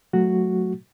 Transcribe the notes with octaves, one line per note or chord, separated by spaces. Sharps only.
F#3 A3 F#4